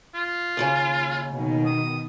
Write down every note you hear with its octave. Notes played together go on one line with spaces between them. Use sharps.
F4
D#2 A2 C#3
B2 D#3
D#6